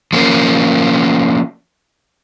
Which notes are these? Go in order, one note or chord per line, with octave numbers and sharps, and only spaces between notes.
F3 A#3 C#4